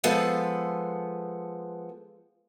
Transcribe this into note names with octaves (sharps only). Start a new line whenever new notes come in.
F3 G#3 B3 A4 C5